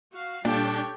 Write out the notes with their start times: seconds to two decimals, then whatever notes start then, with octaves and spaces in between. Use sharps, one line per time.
0.15 F#4 F5
0.45 A#2 G3 D4 G4 A4 C#5 G5